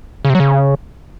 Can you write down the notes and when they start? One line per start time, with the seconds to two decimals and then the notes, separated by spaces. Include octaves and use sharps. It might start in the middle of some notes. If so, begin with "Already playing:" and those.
0.25 C#3
0.30 C3
0.35 F#3
0.40 C#3